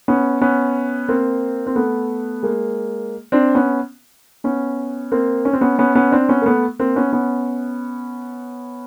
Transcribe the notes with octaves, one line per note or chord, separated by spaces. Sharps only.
B3 C#4
B3 C#4
A#3 C4
C4
A3 B3
G#3 A#3
C4 D4
B3 C#4
B3 C#4
A#3 C4
C#4
C4
B3 C#4
B3 C#4
B3 C#4
C4 D4
B3 C#4
A#3
A3 B3
A#3 C4
B3 C#4
B3 C#4